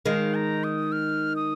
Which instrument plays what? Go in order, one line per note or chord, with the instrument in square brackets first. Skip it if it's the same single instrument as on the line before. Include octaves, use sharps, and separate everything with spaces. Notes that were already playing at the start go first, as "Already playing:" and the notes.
[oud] D#3 G#3 [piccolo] F5
[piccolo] A#5
D#6
F6
D#6